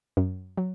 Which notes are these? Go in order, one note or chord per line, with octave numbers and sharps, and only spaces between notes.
F#2
F#3